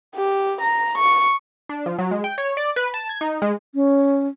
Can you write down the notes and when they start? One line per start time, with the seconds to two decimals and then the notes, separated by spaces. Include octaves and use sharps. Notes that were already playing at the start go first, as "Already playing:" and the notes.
0.15 G4
0.62 A#5
0.98 C#6
1.69 D4
1.86 F3
1.99 F#3
2.11 G#3
2.24 G5
2.38 C#5
2.57 D5
2.76 B4
2.94 A5
3.09 G#6
3.21 D#4
3.42 G#3
3.75 C#4